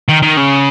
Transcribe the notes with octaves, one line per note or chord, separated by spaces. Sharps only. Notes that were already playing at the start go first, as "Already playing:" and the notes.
D#3
D#3
C#3